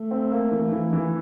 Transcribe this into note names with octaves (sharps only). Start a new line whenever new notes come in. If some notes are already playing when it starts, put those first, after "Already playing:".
Already playing: A3
C4
A#3
E3
E3
E3